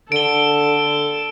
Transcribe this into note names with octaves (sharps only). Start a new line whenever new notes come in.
D3 A4 D7 G7